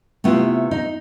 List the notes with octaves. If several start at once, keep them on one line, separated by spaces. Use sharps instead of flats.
C3 A3 B3 E4 F4
D#4